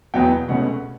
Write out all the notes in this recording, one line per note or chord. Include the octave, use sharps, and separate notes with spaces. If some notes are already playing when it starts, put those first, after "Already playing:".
E2 B2 F#3 B3 G5
C#2 B2 A3 C#4 F#5